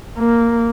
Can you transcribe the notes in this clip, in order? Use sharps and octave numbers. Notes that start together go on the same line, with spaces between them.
A#3